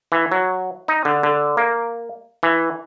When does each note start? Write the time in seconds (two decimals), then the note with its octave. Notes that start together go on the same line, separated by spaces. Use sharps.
0.12 E3
0.32 F#3
0.88 D#4
1.05 D3
1.23 D3
1.57 A#3
2.43 E3